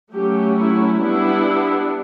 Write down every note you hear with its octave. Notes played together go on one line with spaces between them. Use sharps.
F#3 A3 C#4 G4
E4
G3 B3 D4 E4